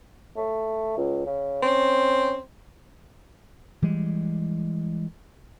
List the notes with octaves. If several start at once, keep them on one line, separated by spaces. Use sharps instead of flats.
A3
C#2
C#3
C4 C#4
E3 G3 G#3